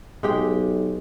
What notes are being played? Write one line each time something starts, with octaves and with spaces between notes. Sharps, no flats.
B1 G#3 G4 G5